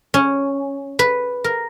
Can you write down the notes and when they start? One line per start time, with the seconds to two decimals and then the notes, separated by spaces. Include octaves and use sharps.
0.14 C#4
0.99 B4
1.44 A#4